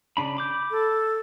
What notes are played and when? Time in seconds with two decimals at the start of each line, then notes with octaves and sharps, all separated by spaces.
0.17 C#3 D4 B5
0.37 B5 D6 G6
0.71 A4